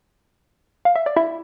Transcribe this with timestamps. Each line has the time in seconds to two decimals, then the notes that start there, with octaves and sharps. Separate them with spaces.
0.85 F5
0.96 E5
1.06 D5
1.16 E4 E5